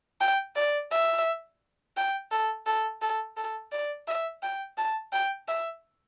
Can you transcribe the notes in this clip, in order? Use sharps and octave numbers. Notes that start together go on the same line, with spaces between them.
G5
D5
E5
G5
A4
A4
A4
A4
D5
E5
G5
A5
G5
E5